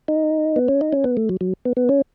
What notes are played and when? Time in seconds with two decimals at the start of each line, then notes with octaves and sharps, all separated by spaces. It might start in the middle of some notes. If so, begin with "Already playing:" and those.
0.08 D#4
0.56 B3
0.68 C#4
0.81 D#4
0.92 C#4
1.04 B3
1.17 A3
1.29 F#3
1.41 F#3
1.65 B3
1.77 B3
1.89 C#4